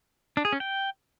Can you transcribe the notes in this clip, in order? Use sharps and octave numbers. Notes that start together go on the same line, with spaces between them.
D4
G#4
C#4
G5